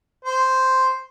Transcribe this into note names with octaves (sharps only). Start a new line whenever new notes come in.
C5